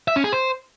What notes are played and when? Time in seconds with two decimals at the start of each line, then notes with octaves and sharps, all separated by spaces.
0.08 E5
0.16 C#4
0.24 G#4
0.32 C5